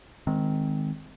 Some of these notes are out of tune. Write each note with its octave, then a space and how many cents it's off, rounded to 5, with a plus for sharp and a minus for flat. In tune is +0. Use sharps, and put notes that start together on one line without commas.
D#3 +0 G#3 +0 C4 -15